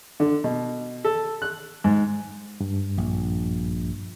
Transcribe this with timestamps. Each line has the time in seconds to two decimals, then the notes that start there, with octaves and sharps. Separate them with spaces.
0.20 D3
0.44 B2
1.05 A4
1.42 F#6
1.84 G#2
2.60 G2
2.98 A#1